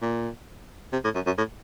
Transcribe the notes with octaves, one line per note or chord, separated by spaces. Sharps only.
A#2
C3
A2
F#2
F#2
A2